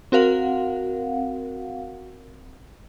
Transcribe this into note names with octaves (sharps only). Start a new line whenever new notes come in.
C4 F#4 A#4 F5 F#5